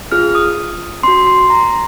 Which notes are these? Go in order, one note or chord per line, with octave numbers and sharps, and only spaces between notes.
C#4 F4 G#4 F6
D#6
C#4 F#4 C6
C6
A#5